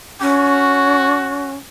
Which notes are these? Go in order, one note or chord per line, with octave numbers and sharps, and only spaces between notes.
C#4 F#4